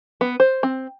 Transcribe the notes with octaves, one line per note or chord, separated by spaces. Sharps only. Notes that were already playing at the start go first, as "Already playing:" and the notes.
B3
C5
C4